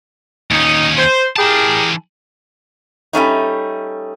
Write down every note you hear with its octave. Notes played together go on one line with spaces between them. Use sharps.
D#2 C#4 D#4
C5
E3 G4 G#4 A#4 A5
G3 A3 C#4 D#4